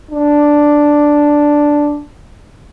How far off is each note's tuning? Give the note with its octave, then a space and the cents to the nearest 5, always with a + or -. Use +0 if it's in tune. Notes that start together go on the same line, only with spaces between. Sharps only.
D4 +0